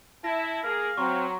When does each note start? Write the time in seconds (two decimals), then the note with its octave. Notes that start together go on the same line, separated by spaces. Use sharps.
0.24 E4 A5 A#6
0.64 A#3 G#4 A#4 F5
0.97 F#3 C4 A#5 C6 C#6